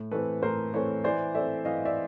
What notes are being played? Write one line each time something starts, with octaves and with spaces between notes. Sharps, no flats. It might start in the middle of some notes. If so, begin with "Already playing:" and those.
Already playing: A2
E3 A3 C4 A4 B4
A2 A#4 C5
E3 A3 C4 B4 C#5
E3 C5 D5
A3 C4 D5 E5
E3 D#5 F5
D5 E5